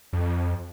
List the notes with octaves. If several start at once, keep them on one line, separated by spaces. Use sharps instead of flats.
F2